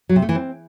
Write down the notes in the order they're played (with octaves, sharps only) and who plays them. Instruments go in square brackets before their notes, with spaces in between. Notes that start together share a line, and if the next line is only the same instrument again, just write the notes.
[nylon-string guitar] F#3
C3
A3
E3
C4